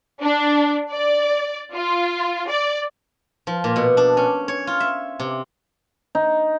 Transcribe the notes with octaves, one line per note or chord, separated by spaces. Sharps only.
D4
D5
F4
D5
F3
A#2
B2
D4
C#4
C#5
F4
E5
C3
D#4